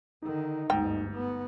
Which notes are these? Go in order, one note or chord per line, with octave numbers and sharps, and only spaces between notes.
D3 D#3 D#4
G1 D2 G#2 G5
B3